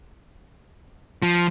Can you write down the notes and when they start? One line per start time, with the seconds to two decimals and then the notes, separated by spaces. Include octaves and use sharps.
1.22 F3